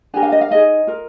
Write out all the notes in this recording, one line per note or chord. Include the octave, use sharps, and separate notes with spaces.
D4 G4 A#4 G#5
F5
D#5
F5
D#4 G#4 D#5
F4 A#4